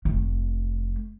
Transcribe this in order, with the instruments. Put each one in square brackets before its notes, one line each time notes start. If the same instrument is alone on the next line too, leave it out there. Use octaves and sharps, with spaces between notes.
[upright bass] F1 A3